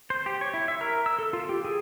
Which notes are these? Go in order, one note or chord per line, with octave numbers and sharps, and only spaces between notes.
C5
G4
C#5
E4
E5
A#4
E6
A4
F4
G4
G#4